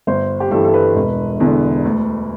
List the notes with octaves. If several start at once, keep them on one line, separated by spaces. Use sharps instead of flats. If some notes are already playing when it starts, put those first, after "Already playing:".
G1 C5
G4
G2 E3 A4
A4
B4
E1
E2 D3
D2